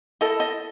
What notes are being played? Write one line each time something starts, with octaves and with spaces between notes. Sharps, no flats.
E4 A4 D#5
D#5